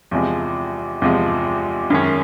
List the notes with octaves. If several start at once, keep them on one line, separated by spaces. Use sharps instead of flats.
E2 C3 F3 G#3
E2 C3 F3 G#3
F#2 D#3 G#3 C#4